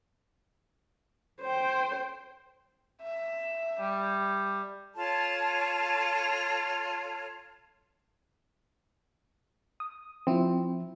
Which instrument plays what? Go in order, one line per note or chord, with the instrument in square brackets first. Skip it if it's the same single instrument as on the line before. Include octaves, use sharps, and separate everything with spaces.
[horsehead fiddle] C5 G5
[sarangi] E5
G3
[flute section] F4 A4 C#5 A5
[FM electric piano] D#6
[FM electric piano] F3 E4 [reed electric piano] C4